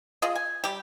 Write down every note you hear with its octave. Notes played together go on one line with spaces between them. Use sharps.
F4 G#4 D#5
G#5
G3 G4